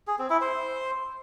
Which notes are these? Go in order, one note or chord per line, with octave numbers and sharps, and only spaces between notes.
G#4
C4
E4
C5